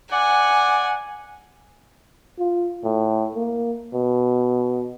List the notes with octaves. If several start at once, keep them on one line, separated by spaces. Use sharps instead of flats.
D5 F#5 G#5
F4
A2
A#3
B2